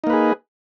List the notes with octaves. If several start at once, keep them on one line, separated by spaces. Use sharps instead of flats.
A#3 D#4 G#4 B4